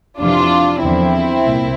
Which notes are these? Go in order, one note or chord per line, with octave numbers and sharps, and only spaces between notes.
F2 C3 E3 D4 F4
E2 D3 F3 C4 E4
C2 A#2